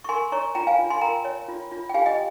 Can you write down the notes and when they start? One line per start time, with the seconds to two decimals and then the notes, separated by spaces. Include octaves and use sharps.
0.04 C#6
0.09 A#4 G#5 C6
0.32 C#5 A#5 C#6
0.55 F4 G5 A#5
0.67 F5 G#5
0.79 F4
0.90 G#5 C6
1.01 A#4 G5 A#5
1.25 C#5
1.48 F4
1.71 F4
1.89 G5
1.94 G4 F5 G#5
2.06 D#5 G5